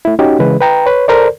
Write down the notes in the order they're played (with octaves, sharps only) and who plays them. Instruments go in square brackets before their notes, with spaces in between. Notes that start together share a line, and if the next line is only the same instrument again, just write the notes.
[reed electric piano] A3 E4
C#4 D#4 F#4 G4
C#3 E3 G#3 B4
B4 G5 A#5
B4 C#5
A4 A#4 C5 D5